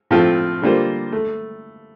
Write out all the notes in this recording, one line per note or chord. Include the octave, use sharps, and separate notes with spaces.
A2 F3 A3 C4 F4
D3 G3 A#3 F4 C5
A3